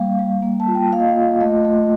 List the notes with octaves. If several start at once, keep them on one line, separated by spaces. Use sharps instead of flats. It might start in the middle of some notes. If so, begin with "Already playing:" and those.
Already playing: G3 A#3 F5
G3
A#3
A5
F4
G5
A#3 F5
D#5
F5
F4
A3 D#5
A3